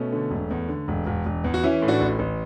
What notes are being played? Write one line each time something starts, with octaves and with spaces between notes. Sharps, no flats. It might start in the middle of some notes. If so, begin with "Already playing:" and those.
Already playing: B2 A3 C#4
D3
E1
E2
D3
E1
E1
E1
E2
F#4
E3 C#4 E4
A2
D4 F#4
A1
A1